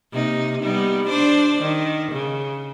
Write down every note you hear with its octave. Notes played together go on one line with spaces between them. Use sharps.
C3 A#3 D#4
G3 B3 D#4
D4 C5 D5
D#3
C#3